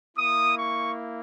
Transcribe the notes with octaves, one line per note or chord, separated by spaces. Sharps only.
A#3 E4 D#6
C#6